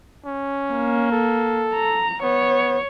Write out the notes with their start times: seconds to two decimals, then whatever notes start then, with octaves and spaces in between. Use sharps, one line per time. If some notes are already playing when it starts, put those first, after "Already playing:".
0.25 C#4
0.72 A#3
1.11 A4
1.75 A#5
2.23 B3 C#5